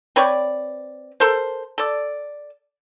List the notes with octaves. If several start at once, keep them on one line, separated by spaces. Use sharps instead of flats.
C4 B4 C#5 D5
A4 A#4 C5
A4 D5